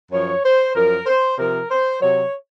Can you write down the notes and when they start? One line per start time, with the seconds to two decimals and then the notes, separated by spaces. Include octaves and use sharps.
0.11 F#2 F3 C#5
0.43 C5
0.74 F#2 F3 A#4
1.06 C5
1.37 C3 F3 A#4
1.69 C5
2.00 C3 F#3 C#5